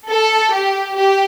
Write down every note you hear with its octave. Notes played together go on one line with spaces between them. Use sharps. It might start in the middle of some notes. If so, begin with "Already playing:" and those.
A4
G4
G4